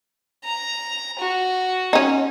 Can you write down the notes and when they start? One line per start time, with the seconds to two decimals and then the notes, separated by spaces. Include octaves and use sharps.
0.44 A#5
1.19 F#4
1.93 C#4 D#4